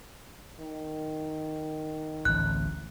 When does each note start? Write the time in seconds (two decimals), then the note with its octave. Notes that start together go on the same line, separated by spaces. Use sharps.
0.59 D#3
2.25 A1 D2 A2 F#6